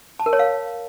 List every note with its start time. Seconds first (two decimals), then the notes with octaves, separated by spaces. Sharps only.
0.20 A5
0.26 A#4
0.33 C#5
0.39 F5